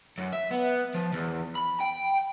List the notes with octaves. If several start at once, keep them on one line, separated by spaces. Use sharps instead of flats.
F#2
E5
B3
F3
E2
B5
G5